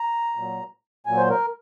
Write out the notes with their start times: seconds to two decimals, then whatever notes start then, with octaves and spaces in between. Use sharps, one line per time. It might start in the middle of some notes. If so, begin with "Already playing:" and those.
Already playing: A#5
0.36 A#2 F#3
1.06 A#2 F#3 G#5
1.17 C5
1.30 A#4